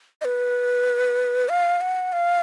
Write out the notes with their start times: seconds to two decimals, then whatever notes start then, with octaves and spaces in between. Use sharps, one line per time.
0.21 D#5
0.25 B4
1.49 F5
1.81 F#5
2.13 F5